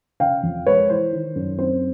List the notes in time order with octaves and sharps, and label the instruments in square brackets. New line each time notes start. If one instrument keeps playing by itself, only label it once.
[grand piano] C#3 F5 G5
F2
G#3 B4 C#5
E3 C5
D#3
F#2
C4 C5